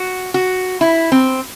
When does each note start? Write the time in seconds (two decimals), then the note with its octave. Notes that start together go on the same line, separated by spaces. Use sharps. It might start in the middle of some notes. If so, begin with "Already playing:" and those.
Already playing: F#4
0.34 F#4
0.81 E4
1.12 C4